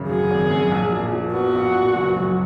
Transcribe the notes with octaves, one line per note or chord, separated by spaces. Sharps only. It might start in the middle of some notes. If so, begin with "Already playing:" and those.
Already playing: G#1 F#2 C#3
F#3 G#4
G#1
F#2
A#1
A#2
F3
B3 F#4
A#1
A#2
F#1
F#2